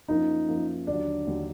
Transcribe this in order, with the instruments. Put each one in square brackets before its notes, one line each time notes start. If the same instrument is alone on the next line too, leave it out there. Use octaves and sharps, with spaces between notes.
[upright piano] F#2 F3 A#3 [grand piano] D#4
[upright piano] F#2 F3 A#3
[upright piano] D#2 D3 F#3 [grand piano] D4
[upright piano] D#2 D3 F#3